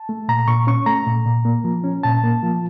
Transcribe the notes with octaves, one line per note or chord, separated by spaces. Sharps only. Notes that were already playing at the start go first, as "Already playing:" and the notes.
Already playing: A5
A3
A#2 A#5
A#2 C#6
C#4 C#6
A3 A#5
A#2
A#2
A#3
F3
C#4
A#2 A5
A#3
F3